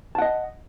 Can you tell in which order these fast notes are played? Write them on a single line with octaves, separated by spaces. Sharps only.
A5 F#5 D#5